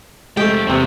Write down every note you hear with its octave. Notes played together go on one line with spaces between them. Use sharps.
F2 G#3 A3 G4 G5
E2 C3 B3 C4